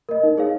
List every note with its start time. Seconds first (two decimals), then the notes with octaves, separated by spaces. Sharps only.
0.09 A#4 D#5
0.23 D#4
0.38 G#4 C#5 F5